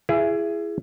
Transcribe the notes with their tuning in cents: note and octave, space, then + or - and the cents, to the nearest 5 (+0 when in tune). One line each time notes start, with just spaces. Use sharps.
E4 +30 G#4 +0